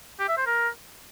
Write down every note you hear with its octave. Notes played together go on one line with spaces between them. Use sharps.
G4
E5
C5
A#4